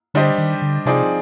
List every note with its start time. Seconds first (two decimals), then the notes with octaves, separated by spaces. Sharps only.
0.14 D3 G3 D4 G4 C5 D#5
0.38 D#3
0.62 D3
0.85 C3 F3 C4 D#4 G#4 D5